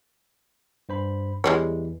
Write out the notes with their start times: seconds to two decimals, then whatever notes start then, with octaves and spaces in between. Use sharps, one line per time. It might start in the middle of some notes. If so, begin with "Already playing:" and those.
0.89 G2 C5 B5
1.44 E2 E3 G3 G#3 C#5